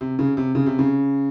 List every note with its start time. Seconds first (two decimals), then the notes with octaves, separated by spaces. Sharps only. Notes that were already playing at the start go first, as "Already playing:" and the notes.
0.01 C3
0.19 C#3
0.37 C3
0.55 C#3
0.66 C3
0.79 C#3